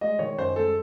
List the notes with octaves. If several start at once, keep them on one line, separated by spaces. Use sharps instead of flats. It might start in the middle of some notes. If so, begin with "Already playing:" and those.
G#3 D#5
D#3 C#5
F#2 C5
G#3 A4